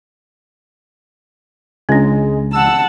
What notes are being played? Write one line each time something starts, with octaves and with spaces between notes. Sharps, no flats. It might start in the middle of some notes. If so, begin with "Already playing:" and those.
C#2 G#3 C#4 D4
F#5 A5 E6